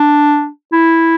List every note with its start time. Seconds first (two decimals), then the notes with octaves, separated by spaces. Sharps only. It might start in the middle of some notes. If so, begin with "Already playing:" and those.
Already playing: D4
0.73 E4